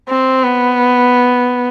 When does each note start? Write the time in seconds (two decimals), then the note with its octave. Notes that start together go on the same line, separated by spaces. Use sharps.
0.09 C4
0.43 B3